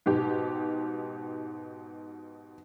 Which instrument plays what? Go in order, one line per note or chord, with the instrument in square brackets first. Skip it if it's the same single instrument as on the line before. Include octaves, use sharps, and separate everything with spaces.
[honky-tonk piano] G#2 B2 G4